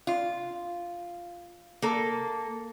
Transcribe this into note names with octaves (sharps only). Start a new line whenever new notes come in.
F4
A#3 A4